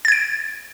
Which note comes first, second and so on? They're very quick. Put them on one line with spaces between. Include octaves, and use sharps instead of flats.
A6 G#6 D7